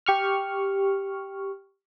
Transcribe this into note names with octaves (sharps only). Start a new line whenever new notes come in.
G4 C#6 F6